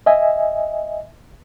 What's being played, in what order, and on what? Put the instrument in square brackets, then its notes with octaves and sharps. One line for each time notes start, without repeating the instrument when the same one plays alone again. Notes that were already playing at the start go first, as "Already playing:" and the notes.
[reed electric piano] D#5 E5 G#5